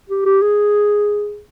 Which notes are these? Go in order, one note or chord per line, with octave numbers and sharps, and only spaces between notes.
G4
G4
G#4